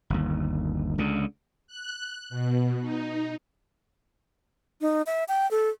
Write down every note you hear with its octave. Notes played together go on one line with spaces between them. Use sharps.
G1 D#2
C#2 D3
F#6
B2
D#4
D#4
E5
G5
A4